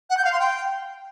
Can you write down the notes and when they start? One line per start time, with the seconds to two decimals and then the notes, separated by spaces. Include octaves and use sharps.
0.10 F#5
0.17 G6
0.25 F5
0.32 C6
0.40 G5